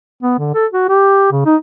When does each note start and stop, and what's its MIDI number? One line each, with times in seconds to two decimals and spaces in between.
0.22 0.34 59
0.38 0.50 50
0.54 0.66 69
0.73 0.85 66
0.89 1.28 67
1.31 1.42 49
1.45 1.56 63